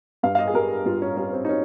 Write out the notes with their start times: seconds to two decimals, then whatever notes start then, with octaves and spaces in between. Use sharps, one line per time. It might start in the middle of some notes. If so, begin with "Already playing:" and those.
0.23 G2 F5
0.35 F5
0.39 D#5
0.48 G#4
0.54 G3 A#4
0.85 G2 F4
1.02 C#4
1.17 G3 C#4
1.33 C4
1.45 D#4
1.49 C#4